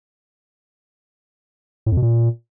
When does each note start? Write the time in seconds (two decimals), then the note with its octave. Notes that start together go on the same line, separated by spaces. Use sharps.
1.86 A2
1.92 F2
1.97 B2
2.02 A#2